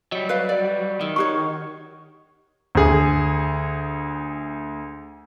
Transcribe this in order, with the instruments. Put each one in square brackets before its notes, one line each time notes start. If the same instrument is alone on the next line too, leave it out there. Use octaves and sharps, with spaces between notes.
[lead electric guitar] F#3 G3 [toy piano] D#5
[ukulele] B4 F5
D5
[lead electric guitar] D#3 [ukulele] E4
[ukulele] D#4 F#4 C#5 [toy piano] G4 C#6
[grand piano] D2 G#4